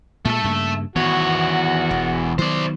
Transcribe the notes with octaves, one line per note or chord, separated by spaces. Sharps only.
A#2 G#3 A3 A4
G2 C#3 A#3
E2 D#3 B3 F#4 C#5
E1
D#3 F#3 B3 C5 D5